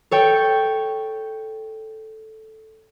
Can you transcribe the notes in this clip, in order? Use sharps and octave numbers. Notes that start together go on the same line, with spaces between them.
A4 C#5 G5